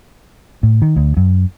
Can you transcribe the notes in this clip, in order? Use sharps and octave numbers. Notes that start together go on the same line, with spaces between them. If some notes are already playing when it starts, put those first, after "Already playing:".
A2
D#3
D2
F#2